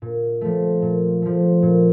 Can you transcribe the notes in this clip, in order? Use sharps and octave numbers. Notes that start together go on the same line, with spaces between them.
A#2
F3 A3
A#2
F3 A3
A#2